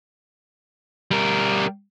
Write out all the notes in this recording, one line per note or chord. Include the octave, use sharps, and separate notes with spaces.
G3 A#4